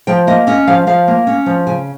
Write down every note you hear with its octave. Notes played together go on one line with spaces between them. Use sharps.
F3 G5
A#3 D#5
C#4 D#5
F3 F5
F3 F5
A#3
C#4
F3
C#3 G#5